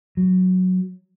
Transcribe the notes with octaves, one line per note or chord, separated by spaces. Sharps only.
F#3